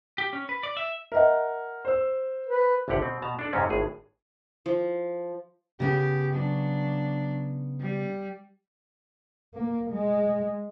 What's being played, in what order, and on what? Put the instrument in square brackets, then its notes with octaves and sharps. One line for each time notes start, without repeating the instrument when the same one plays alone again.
[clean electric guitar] G4
C#4
B4
D5
E5
[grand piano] A#4 F#5 [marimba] D#5 E5
[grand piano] C5 E6
[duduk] B4
[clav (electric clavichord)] G1 C2 D3 G4 F#5
B2 C4
B2 A5 A#5
D4 A4 D5
F2 G#2 C3 C4 C#4
G#1 A2 G#4
[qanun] F3
[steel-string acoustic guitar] C#3 B3 [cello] G4
[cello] F#3 D4
G3
[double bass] A#3
G#3